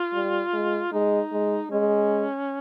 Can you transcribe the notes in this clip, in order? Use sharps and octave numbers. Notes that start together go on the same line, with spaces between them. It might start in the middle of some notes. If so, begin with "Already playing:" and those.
Already playing: F4
G3
G#3
G#3 D#4
G#3
G#3 C#4